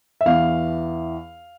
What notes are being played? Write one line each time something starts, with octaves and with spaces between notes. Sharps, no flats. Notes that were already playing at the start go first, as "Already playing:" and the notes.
E5
E2 E3 F5